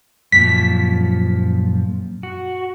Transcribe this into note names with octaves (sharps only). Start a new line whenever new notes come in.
F#2 A#2 F3 B6
F#4